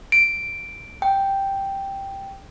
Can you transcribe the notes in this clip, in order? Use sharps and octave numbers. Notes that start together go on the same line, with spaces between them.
D7
G5